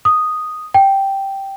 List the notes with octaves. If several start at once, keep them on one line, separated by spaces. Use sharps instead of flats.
D#6
G5